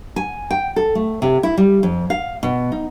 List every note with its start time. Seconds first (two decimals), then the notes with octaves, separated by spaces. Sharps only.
0.16 G#5
0.51 G5
0.76 A4
0.95 A3
1.22 C3
1.43 E4
1.57 G3
1.83 F2
2.10 F5
2.43 B2
2.72 D#4